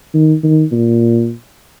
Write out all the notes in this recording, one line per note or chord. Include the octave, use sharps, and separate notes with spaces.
D#3
D#3
A#2